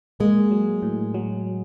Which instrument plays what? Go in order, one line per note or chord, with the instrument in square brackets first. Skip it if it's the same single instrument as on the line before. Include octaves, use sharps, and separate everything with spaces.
[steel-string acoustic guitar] G#3 [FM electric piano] A#3
[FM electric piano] F#3
A2
F#3